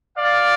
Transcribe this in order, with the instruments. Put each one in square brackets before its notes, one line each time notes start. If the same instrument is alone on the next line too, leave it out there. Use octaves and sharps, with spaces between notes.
[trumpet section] D5 F5